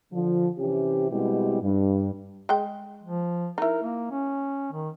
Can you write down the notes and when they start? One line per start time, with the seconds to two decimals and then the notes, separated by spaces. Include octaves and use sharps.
0.13 D3 F3
0.58 C3 E3 C#4 G4
1.10 B2 G3 G#3 C4 E4 G4
1.62 G2
2.49 G#3 G5
3.03 F3
3.58 D#4 E4 A#4
3.82 A#3
4.11 C#4
4.72 D#3